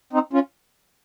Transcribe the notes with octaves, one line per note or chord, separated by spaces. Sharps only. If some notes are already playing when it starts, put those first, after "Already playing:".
C4 D#4
C#4 F4